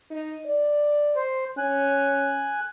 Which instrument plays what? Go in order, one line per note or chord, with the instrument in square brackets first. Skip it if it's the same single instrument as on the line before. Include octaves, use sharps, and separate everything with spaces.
[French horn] D#4
D5
[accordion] C5
[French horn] C#4 [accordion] G#5 F#6